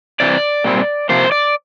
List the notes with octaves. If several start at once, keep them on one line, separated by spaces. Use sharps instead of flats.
C3 E3 C4 D5
A#2 G3 C4
C3 F3 A#3 C5
D5